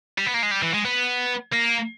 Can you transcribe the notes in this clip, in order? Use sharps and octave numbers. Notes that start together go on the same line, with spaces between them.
G3
B3
A#3
G#3
G3
E3
G#3
B3
A#3